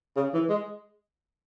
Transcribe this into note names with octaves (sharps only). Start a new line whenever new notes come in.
C#3
E3
G#3